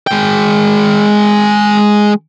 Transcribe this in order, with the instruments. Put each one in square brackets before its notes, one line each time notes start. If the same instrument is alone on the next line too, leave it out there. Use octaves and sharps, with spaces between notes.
[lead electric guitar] G#3 G5